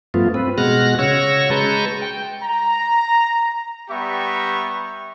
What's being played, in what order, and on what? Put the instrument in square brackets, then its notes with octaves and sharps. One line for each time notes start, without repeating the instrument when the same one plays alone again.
[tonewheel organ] G2 F3 A3 B3 F4
C4 B4
B2 G#3 F#4 F6 F#6 A#6
C#3 F#4 C#5 C#6 E6 A#6
G#3 B4 A5 A#5 C#6 G6
G5
[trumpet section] A#5
G3 B3 G4 E5 A#5 C#6